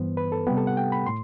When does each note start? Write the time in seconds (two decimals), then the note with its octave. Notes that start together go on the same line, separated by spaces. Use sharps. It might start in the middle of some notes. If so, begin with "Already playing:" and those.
Already playing: G2 E3 B3 C5
0.17 B4
0.32 A4
0.47 C3 G3 B3 G4
0.57 A4
0.67 F#5
0.77 G5
0.92 B5
1.06 A2 C6